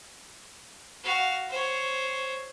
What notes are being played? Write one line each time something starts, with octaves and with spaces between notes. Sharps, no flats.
F#4 F5
C5 C#5